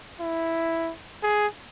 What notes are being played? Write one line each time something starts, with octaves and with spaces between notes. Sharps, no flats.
E4
G#4